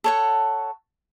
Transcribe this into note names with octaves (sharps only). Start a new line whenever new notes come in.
A4 C#5 F#5